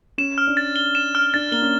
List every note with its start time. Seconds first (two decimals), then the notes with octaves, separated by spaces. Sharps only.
0.18 C#4 E7
0.38 F6
0.47 D4
0.57 A6
0.76 G7
0.95 E7
1.15 F6
1.34 D4 A6
1.52 A#3 G7
1.62 C#4